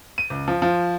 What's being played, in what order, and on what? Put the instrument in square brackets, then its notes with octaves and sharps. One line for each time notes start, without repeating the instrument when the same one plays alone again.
[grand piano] D#7
C#2
F3
F3